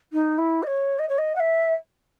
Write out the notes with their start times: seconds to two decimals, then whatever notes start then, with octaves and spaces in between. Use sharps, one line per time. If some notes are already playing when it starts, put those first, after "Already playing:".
0.12 D#4
0.38 E4
0.62 D#5
0.66 C#5
0.98 D#5
1.09 C#5
1.18 D#5
1.35 F#5
1.39 E5